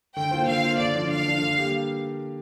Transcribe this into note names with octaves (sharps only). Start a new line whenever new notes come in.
D3 G5
A#3 F4 C5
D3 F5
A#3 F4 C5
D3 D5
F3 D4
D3 F5
F3 D4
D3
G3 A#3 G4